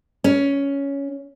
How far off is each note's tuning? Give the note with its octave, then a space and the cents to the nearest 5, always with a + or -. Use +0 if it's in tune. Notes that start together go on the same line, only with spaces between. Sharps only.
C#4 +10